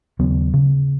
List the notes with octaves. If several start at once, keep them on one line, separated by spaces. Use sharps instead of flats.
D#2 C#3 F#3 B3
C#3